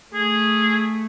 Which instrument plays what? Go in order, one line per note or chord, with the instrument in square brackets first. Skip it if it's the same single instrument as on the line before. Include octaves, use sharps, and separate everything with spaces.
[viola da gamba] A3 [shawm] G#4